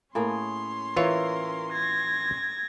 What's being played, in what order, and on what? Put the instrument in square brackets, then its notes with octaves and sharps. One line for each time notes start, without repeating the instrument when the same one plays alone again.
[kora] A2 A#3 G#4 [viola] C#4 C6
[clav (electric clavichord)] E3 F4 C#5 [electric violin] A#4 [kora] E5
[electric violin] G#6 A#6